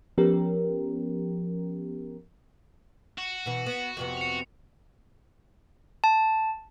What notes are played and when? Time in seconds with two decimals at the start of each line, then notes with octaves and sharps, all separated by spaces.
0.18 F3 B3 C#4 G4 A#4
3.18 F#4 E7
3.46 B2 E3
3.66 B3
3.97 F2 C3 B3
4.17 C#7 F7
6.04 A5